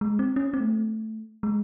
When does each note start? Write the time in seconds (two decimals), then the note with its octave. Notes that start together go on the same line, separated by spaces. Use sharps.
0.01 G#3
0.19 C4
0.36 C#4
0.54 C4
0.60 A3
1.43 G#3